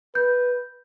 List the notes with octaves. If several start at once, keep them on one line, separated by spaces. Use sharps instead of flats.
B4 G6